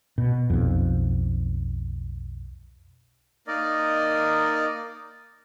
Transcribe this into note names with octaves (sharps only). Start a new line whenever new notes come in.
B2
B1 F2
A#3 D#4 A#4 D5 D#5